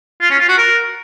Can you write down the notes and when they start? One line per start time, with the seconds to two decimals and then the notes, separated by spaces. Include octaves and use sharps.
0.21 F4
0.31 C#4
0.40 F4
0.49 F#4
0.58 A#4